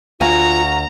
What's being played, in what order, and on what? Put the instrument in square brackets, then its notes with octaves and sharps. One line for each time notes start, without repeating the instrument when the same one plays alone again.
[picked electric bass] D2 [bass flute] F4 [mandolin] F#4 F5 G#5 [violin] A#5